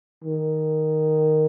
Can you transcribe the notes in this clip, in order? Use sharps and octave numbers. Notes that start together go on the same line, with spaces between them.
D#3